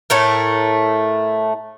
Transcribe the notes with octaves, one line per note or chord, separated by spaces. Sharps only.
A2 A3 A#4